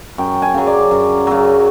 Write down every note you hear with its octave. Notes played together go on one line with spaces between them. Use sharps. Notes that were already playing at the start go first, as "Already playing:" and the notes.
F#2 G5
G#5
C#3 F#3
D5
F#2
C#3 F#3